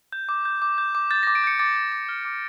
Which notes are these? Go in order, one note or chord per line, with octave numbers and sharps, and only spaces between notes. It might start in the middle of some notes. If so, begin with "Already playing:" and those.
G6
D6
G6
D6
G6
D6
G6 A6
A#6
D6
D7
G6 C#7
D6 A6
G6
D6
F6
D6